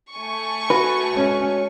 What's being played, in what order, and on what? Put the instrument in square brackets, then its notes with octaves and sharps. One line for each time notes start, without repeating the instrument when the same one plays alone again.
[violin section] A3 G#5 C#6
[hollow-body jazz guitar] F#4 B4
[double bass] G#3 C#4